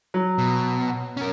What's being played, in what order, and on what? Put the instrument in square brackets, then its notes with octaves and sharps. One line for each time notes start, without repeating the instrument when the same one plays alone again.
[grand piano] F#3
[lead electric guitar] B2
C#4 A#4